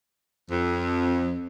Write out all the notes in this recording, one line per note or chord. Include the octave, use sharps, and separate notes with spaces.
F2